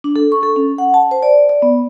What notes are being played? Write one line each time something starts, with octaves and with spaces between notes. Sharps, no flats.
D4
A4
C#6
A4
C#4
F#5
A5
C5
D5
D5
B3